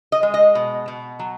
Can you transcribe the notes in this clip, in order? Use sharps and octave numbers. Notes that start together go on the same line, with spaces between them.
D#5
G#3
D#5
B2
B2
F#3